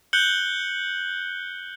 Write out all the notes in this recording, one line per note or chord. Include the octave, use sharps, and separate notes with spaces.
F#6 G6 C#7 F#7 G7